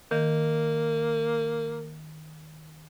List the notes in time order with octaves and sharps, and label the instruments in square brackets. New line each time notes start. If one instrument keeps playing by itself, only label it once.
[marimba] D#3 [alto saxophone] A#3